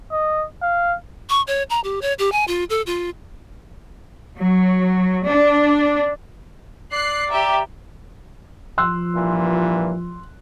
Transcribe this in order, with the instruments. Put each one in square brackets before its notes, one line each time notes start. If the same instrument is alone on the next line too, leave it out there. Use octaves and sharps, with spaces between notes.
[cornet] D#5
F5
[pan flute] C#6
C#5
A#5
G4
C#5
G4
G#5
F4
A4
F4
[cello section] F#3
D4
[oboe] D5 [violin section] F#6 C7
[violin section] G4 E5 [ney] A#5
[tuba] F3 [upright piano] C6 E6 F#6
[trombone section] G2 A#2 E3